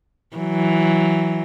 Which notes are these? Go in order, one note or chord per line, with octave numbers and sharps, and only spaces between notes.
E3 F#3